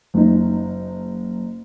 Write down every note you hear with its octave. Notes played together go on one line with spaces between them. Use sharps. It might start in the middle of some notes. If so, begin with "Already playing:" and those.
F#1 D#4